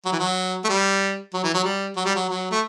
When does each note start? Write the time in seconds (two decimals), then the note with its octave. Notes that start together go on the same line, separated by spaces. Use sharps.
0.06 F#3
0.12 E3
0.20 F#3
0.64 A3
0.69 G3
1.34 F#3
1.44 E3
1.54 F#3
1.64 G3
1.97 F#3
2.05 G3
2.15 F#3
2.29 F#3
2.51 A3